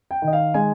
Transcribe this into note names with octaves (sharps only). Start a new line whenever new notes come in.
G5
D#3
D#5
F5
G#3 G#5